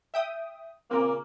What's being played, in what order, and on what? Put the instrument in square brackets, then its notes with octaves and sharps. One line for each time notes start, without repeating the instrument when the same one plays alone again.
[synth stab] E5 G5 D#6
[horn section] A#2 C#3 A#3 [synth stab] C4 A#4